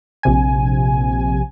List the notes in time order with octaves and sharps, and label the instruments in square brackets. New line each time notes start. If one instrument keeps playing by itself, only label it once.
[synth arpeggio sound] A#1 C3 G#5